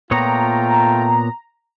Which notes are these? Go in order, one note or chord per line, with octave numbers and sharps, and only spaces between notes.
A#2 A3 B3 F4 C#5 G5 A#5